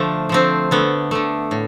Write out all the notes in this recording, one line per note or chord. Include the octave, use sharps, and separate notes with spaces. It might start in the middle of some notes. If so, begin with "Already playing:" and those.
Already playing: D3 F3 A3
D3 F3 A3 C4
D3 A3 B3
D3 A3
A2